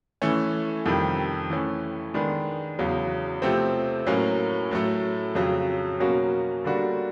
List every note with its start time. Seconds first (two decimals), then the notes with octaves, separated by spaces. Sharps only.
0.22 E3 A3 C#4
0.86 F2 C3 D#3 G3
1.50 E3 A3 C#4
2.14 D#3 G#3 B3 D4
2.79 E2 C#3 F#3
3.42 C3 F3 A3 C4
4.06 A2 F#3 A#3 C#4
4.71 A2 F#3 A3
5.35 F2 C#3 F#3
6.00 B2 F#3 A#3 C#4 F#4
6.64 D3 G3 A#3 D4 F#4